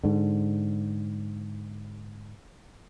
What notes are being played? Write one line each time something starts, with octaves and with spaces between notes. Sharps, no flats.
G#2 D3